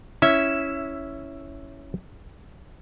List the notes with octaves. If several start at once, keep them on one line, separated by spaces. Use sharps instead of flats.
C#4 E4 E5